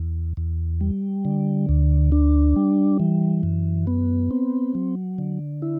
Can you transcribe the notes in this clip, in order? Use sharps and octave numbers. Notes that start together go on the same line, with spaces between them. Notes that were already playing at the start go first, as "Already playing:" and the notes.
Already playing: E2
E2
G3
D3
D2
D4
G3
E3
F#2
B3
C4
F#3
D3
E4